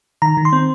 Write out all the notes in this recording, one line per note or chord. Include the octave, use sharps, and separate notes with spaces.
D#3 A#5
D#3
C6
C4